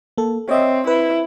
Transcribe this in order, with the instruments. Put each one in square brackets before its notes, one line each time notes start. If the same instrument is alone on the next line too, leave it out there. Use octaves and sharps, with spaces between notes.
[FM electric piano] A#3 A4
[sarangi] C4 [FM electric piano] C#5 D#5 E5
[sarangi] E4 [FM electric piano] B4